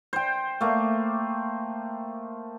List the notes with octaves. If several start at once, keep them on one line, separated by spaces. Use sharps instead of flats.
C5 G5
A3 A#3